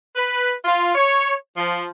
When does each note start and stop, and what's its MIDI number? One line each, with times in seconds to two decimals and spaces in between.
0.16 0.52 71
0.64 0.93 65
0.95 1.33 73
1.56 1.86 53